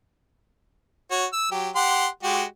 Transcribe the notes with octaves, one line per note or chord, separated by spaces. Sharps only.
F#4 C#5
E6
F#3 G4
G4 F#5 C6
G#3 F#4 G4